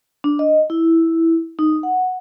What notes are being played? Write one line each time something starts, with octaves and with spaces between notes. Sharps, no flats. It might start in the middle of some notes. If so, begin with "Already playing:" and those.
D4
D#5
E4
D#4
F#5